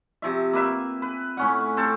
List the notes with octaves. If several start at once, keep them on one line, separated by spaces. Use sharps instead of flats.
C3 F3 E5
A#3 B4 E5
B4
A2 C#4 F#5
C4 A4